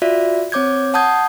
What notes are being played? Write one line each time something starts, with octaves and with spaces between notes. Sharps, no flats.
F4 F#4 D5 E5
C4 C#5 D6 G6 G#6
F#5 A5 D#6 G6 G#6